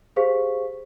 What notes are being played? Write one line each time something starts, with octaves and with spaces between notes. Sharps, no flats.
G4 G#4 C5 F5 C#6 B6